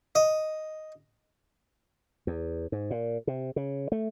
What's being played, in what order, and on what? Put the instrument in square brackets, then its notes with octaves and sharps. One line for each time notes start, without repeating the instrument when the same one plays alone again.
[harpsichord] D#5
[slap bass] E2
G#2
A#2
C3
C#3
A3